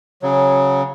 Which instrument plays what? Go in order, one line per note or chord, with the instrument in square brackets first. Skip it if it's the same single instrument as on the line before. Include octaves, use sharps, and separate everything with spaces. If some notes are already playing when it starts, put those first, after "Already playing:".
[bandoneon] C#3 F#3